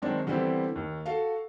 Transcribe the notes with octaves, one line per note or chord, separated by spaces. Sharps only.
D#3 F#3 G#3 C4 D4 F#4
D3 E3 G3 B3 C4 G4
D#2
F#4 A4 F5